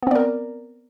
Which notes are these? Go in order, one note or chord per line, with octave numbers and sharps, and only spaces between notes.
B3 C4 A#4 D5